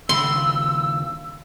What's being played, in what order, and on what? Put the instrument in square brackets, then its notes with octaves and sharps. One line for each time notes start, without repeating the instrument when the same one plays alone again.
[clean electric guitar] D#2 C#3 B5 [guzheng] C6 [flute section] E6